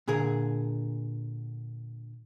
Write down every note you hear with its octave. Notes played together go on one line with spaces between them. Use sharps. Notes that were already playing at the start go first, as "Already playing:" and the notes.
A#2 D3 G#4 A#4